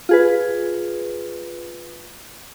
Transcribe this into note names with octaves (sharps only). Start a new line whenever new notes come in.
F4 G#4 B4